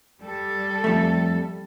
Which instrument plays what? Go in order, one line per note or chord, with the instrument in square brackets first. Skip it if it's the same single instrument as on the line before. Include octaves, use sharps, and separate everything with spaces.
[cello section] G3 A4
[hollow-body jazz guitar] F2 A3